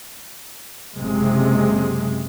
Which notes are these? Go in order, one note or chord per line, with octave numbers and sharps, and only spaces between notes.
F#1 C3 G#3